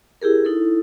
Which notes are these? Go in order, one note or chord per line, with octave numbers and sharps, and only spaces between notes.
E4 G4 G#4 A#4
D#4 E4 A4